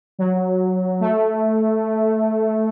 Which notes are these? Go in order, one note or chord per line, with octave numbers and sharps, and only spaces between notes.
F#3
A3